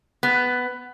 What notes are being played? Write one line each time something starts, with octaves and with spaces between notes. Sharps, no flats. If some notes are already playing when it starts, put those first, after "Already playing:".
B3